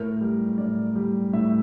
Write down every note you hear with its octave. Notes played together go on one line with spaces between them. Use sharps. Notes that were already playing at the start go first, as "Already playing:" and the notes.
Already playing: A2 A#4
G3
A2 D5
G3
A2 E5